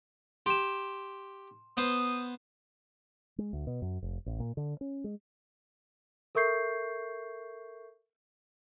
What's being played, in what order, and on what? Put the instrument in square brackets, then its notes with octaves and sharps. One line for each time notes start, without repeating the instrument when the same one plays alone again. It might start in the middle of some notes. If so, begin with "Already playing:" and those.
[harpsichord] G4 [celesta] C6 E7
[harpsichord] B3 C5 [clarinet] D#6
[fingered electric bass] G#3
D2
B2
F#2
F1
A1
A#2
D3
C#4
G#3
[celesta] A4 A#4 E5 C#6 G6 C7